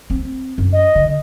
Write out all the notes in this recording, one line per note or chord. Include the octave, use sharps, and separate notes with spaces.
C4
F#2
D#5
D3